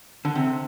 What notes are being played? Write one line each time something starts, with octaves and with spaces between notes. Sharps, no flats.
D3
C3